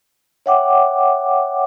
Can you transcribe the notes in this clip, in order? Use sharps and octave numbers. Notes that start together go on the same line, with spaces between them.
C#5 E5 F#5 G5 D6